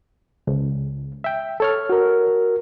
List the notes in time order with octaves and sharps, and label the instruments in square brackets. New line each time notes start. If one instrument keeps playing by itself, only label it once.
[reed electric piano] C#2
E5 G5
A4 C#5 F6
[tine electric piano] F#4 A#4